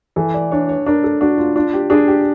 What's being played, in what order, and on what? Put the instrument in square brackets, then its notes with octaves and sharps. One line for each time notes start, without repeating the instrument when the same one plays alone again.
[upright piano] E3 [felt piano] A4
[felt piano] D5
[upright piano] D4 [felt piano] C#5
[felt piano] C#5
[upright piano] D4 [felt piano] A#4
[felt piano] A4
[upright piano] D4 [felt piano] F#4
[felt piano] F4
[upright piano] D4 [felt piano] F4
[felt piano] G4
[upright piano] D4 [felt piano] G#4
[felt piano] G4